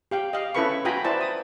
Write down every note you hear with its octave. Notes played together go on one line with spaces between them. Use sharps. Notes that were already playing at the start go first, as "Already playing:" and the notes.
G4 F5 G5
D#5 F5
C#4 E4 A4 B4 B5 C#6
F4 F#4 G5 G#5 A#5 B5
E4 B4 C5 D5 A5 B5
D#6